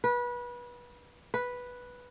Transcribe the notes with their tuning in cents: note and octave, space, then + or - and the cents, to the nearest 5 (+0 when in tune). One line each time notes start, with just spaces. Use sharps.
B4 -25
B4 -5